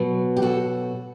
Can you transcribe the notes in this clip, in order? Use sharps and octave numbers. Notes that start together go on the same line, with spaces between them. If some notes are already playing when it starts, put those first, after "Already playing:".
Already playing: B2 F#3
G4
F#4 A4